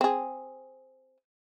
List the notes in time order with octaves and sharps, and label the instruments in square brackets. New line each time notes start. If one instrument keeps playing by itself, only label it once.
[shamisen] C4 G#4